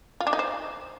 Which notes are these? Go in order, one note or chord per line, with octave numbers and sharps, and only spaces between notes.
F4
D4
D#4
C5